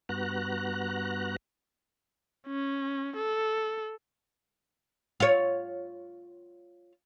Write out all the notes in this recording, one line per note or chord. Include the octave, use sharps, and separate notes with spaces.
G2 B3 F#4 A#5 F#6
C#4
A4
F4 C#5